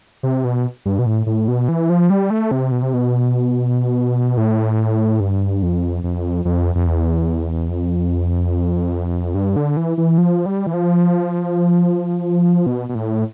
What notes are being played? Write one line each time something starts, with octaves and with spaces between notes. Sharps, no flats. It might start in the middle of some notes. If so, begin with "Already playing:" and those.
C3
B2
G2
B2
A2
A2
B2
E3
F3
G3
A3
C3
B2
C3
B2
A2
G2
F2
F2
F2
F2
E2
F2
G2
D3
E3
E3
F3
G3
E3
F3
B2
B2
A2